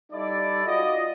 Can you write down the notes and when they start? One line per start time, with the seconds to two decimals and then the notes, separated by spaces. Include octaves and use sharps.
0.13 G3 D#4 E4 A4 D5
0.66 F4 F#4 D5 D#5